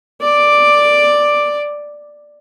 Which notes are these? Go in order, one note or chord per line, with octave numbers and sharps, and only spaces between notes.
D5 D6